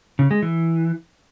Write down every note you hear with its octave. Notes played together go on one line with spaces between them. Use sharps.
C#3
G#3
E3